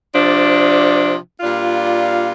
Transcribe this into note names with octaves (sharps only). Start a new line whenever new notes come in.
C3 F3 D4
A#2 G3 D4 F4